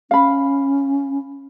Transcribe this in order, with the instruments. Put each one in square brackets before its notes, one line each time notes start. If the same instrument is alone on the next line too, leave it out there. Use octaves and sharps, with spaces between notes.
[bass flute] C#4 [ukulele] F5 B5